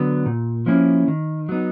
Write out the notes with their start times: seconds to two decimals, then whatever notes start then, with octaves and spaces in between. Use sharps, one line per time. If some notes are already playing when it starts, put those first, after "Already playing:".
Already playing: D3 F#3 B3
0.26 A#2
0.66 F3 A#3 C#4 E4
1.08 D#3
1.49 F#3 B3 D#4